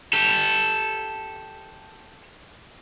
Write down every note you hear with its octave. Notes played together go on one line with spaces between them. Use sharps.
G4 A4